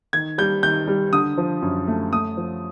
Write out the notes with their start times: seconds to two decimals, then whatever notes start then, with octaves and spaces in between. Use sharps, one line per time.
0.13 D#3 G#6
0.38 G3 G6
0.63 D#3 G6
0.88 G3
1.13 D3 D#6
1.38 F3
1.62 F#2
1.88 A3
2.12 A3 D#6
2.37 F3